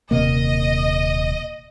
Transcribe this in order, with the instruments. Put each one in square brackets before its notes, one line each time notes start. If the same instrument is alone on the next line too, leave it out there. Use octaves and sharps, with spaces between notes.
[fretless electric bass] D#1 C3 A#3 [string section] D#5